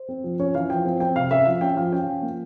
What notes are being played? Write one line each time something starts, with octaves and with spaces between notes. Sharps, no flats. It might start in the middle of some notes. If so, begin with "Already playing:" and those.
Already playing: C5
C4
F3
C#4 C#5
E3 F5
F3 G5
C4
C4 G5
C3 F5
C#4 E5
F3 F5
C#4 G5
F3 F5
C#4 G5
F3
A#3